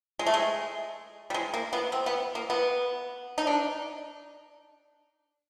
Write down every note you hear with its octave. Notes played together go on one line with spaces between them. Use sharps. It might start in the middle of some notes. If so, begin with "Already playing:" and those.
G#3
A3
G#3
G3
G#3
A#3
B3
C4
B3
A#3
B3
D#4
D4